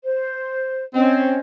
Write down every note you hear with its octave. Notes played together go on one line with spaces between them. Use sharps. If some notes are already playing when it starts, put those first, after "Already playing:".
C5
C4 C#4 C5 D#5